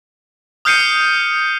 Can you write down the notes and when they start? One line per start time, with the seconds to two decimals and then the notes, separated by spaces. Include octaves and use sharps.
0.65 D#6 F6 G6 C7 C#7 D#7